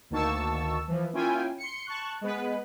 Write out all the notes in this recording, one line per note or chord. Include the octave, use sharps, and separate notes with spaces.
D2 D#3 A#3 A5 C#6 E6
E3 F3
A#3 C#4 E4 F4 G5 G#5
C6 C#7
A5 C#6 F#6
G#3 B3 B4